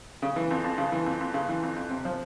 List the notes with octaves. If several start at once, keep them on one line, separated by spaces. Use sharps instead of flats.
C#3
E3
F2
F2
C#3
E3
F2
F2
C#3
E3
F2
F2
C3
F3